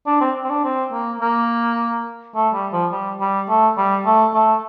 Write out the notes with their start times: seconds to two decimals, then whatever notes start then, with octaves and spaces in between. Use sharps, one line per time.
0.07 D4
0.21 C4
0.45 C4
0.50 D4
0.64 C4
0.92 A#3
1.21 A#3
2.35 A3
2.54 G3
2.73 F3
2.92 G3
3.21 G3
3.49 A3
3.78 G3
4.06 A3
4.34 A3